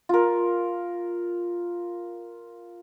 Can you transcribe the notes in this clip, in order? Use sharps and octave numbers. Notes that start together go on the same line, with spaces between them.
F4 A#4